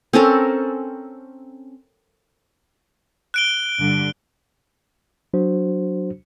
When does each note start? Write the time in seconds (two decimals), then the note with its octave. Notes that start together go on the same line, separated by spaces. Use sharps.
0.13 C4 C#4 A4 A#4
3.34 F#6 D7 G7
3.79 G2 D3 G3
5.34 F#3 D4 F#4 C5